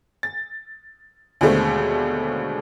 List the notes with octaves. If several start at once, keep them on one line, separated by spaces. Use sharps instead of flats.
A6
D#2 B2 D3 G#3 A3 C4